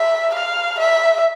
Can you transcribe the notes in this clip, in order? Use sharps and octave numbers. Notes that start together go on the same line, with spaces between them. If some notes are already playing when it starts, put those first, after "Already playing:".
Already playing: E5
F5
E5